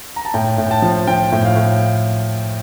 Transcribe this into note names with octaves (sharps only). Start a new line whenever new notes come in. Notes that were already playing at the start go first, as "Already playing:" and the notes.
A#5
A5
A2 G5
A2
G5
A5
F3
F3 G5
A2
F5
A2